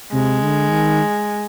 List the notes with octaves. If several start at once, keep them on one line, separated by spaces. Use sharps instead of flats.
C3 G#3
D3
D#3